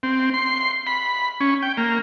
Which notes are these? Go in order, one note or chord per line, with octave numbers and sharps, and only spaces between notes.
C4
C6
B5
C#4
G5
A#3